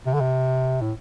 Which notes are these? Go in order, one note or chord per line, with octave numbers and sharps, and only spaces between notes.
C3
D3
C3
A2